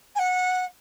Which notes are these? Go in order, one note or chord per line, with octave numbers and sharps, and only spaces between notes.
G#5
F#5